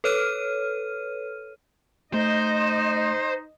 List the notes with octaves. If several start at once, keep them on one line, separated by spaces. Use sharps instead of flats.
A4 B4 C#5 F6 D#7
A3 D#4 C5 D#5